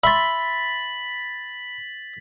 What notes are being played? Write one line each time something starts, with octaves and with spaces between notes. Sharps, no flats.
E5 B5 C6 A6 B6 F#7